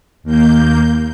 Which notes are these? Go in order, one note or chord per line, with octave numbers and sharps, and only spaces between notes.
D#2 A#3 G6